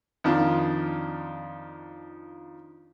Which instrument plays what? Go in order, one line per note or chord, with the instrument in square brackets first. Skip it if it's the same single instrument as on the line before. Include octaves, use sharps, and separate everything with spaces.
[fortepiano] F2 D#3 D4 F4